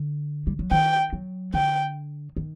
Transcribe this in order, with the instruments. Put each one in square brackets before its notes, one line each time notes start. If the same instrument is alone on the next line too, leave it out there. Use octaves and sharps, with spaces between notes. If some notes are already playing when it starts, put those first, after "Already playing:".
Already playing: [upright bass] D3
G3
F#3
[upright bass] D#3 [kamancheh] G5
[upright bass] F#3
[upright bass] D3 [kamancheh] G5
[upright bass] D#3